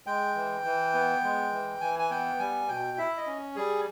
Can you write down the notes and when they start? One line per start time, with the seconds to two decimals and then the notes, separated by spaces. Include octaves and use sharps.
0.07 G#3 G5
0.36 E3
0.64 E3
0.94 B3
1.24 G#3
1.52 E3
1.81 E3 G#5
1.99 G#5
2.11 B3 G5
2.39 G3 G#5
2.68 B2 G5
2.98 E4 E5
3.17 D#5
3.27 C#4
3.56 G3 G#4